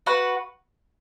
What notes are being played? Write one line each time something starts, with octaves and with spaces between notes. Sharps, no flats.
F#4 B4 F#5